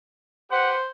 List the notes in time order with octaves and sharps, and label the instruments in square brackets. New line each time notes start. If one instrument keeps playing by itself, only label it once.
[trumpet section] G4 B4 F#5 [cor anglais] C5